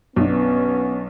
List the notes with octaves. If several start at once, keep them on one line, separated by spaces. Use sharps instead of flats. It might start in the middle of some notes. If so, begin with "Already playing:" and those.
B1 B3 C#4 D4